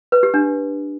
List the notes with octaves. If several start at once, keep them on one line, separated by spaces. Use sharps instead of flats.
B4
G4
D4